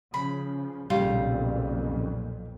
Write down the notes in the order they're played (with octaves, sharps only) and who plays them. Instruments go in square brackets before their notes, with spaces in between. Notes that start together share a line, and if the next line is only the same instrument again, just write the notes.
[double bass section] C#3 F3 [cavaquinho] B5
[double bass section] B1 F2 A#2 [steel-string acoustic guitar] C#3 G3 [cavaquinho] F4